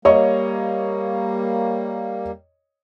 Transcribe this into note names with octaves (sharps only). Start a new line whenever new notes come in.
G3 A#3 C#5 D#5 C#6